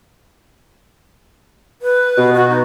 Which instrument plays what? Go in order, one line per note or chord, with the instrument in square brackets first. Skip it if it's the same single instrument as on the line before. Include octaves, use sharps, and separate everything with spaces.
[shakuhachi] B4
[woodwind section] B2
[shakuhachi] F#4
D#4